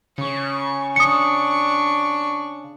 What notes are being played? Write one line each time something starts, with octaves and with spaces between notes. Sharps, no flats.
C#3 C#6
D4 C#6 D#6 C#7